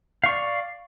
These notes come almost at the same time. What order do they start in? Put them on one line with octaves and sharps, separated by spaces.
F5 C#6 D5